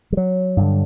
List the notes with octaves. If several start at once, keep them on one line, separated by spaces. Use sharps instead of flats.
G3
F#3
G2 D3